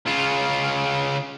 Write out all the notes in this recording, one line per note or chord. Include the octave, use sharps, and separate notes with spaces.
C#3 F4